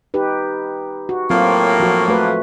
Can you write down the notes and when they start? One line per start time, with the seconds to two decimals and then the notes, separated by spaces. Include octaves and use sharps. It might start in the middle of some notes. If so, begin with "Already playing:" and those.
0.14 D#4 G4 B4
1.09 F#4
1.30 A2 F#3 A#3 C4 F4
1.80 F3 F#4
2.08 A3 F#4 B4